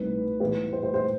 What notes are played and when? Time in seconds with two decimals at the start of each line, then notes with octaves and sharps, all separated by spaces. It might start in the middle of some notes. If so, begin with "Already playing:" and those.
Already playing: C2 B2 A3 D#4 B4
0.40 A2 E3 B3 B4
0.72 C5
0.83 C5
0.94 C5